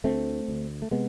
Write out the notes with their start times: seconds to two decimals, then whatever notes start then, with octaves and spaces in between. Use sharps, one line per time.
0.04 D2 D3 A3 C4
0.48 D2 D3
0.82 A3
0.91 C3 G#3 B3